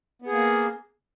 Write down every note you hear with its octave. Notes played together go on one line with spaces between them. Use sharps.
A#3 B3 G#4